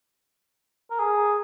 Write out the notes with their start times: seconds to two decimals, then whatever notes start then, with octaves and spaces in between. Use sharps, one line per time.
0.91 A#4
1.00 G#4